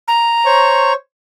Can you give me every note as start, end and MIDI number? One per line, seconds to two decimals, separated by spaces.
0.08 0.93 82
0.45 0.94 72
0.45 0.94 73
0.45 0.94 85